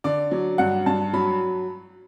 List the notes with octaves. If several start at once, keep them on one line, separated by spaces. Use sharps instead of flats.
D3 D5
F#3
G2 F#5
G2 A5
F#3 B5